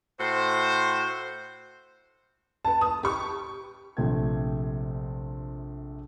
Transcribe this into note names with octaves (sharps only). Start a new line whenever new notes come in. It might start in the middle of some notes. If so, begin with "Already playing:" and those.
A2 F#4 C5
B4 A5
D#6
G4 C#6
A#1 C3 A3 F4 G5 G#6